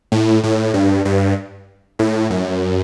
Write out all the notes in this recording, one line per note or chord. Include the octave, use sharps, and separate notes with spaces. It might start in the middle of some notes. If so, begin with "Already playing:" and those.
A2
A2
G2
G2
A2
F#2